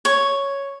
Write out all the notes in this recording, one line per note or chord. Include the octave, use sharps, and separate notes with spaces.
C#5